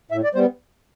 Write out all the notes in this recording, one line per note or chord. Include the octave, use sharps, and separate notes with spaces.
A2 E5
D5
G3 B3 C5